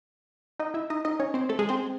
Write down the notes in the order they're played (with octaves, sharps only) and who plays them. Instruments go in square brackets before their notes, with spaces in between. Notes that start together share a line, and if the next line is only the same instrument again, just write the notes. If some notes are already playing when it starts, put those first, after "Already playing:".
[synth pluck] D#4 D#5
E4 E5
D#4 D#5
D#4 D#5
C#4 C#5
C4 C5
A3 A4
G#3 G#4
C4 C5